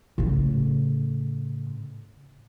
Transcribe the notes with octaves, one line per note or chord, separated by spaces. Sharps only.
A2 C#3